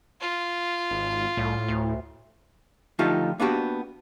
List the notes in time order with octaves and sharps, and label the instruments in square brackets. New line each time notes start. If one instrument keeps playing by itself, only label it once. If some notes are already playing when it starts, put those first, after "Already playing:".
[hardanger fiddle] F4
[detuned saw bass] G#1
[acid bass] C2 [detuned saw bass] A2
[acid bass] D2
[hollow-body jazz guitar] D3 F3 A3 D#4 F4 G4
A#3 B3 D4 F#4 G4